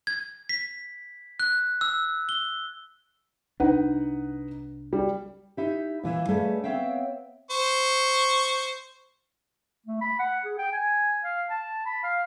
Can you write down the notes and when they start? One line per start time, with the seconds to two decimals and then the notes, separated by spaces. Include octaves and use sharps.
0.07 G#6
0.49 B6
1.40 F#6
1.81 E6
2.29 G7
3.60 C2 D4 D#4 B4 F#5
4.93 G3
5.57 D#4 E4 G4
6.03 A#2 E3 E4
6.28 G3 A3 C#4 G#4 B4 F5
6.64 B3 C4 C#5 E5 F5 G5
7.51 C5 C#6
9.87 A3
10.01 B5
10.19 F#5
10.45 G#4
10.59 G5
10.73 G#5
11.24 F5
11.50 A5
11.86 B5
12.04 F5